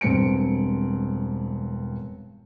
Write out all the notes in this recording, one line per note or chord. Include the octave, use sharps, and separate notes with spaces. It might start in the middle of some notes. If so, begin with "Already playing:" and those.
E1 G2 C4 C#7 D7